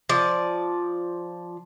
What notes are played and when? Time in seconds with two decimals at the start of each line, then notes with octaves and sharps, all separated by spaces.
0.09 F3 D5